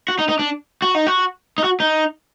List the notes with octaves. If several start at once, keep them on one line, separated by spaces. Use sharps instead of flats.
F#4
D#4
D#4
D4
F#4
D#4
F#4
D#4
F#4
D#4